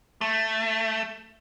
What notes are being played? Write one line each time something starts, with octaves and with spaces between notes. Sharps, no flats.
A3